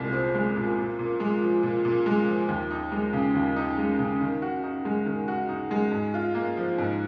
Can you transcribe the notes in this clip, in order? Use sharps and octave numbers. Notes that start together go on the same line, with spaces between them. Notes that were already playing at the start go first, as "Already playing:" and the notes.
Already playing: C2 A#2 G#3
C4
G#3
A#2
A#2
A#2
G#3
F3
A#2
A#2
G#3
F3
D#2
D#4
G#3
C#3
D#2
D#4
G#3
C#3
D#3
F#4
D#4
G#3
D#3
F#4
D#4
G#3
G#2
F4
A#3
F3
G#2